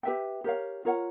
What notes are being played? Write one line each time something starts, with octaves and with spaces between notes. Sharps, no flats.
G4 B4 E5 G5
G4 A#4 C#5 F5
F4 A#4 C#5 F#5